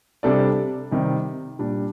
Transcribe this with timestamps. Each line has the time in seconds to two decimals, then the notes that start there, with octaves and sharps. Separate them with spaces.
0.23 C3 G3 D4 A4 D5
0.91 C3 D#3 G3
1.59 A#2 G3 D4